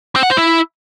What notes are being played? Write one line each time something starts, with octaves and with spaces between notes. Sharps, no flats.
C4
F#5
C5
E4